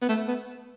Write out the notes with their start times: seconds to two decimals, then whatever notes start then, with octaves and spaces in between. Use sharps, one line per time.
0.02 B3
0.09 A3
0.28 B3